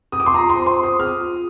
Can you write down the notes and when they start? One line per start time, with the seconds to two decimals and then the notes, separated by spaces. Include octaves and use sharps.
0.12 D#6
0.20 D6
0.26 C6
0.34 F4 A#5
0.50 C6
0.55 C5
0.66 C6
0.77 F4
0.83 D#6
0.99 G#4 F6
1.21 F4